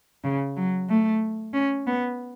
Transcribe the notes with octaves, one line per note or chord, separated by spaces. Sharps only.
C#3
F#3
A3
C#4
B3